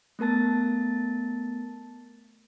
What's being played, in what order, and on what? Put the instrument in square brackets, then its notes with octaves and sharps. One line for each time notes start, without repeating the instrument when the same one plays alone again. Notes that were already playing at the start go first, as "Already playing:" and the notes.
[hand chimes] A3 B3 A#4 A5 A6